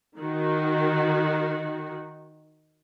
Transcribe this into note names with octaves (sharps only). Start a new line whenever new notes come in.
D#3 F#4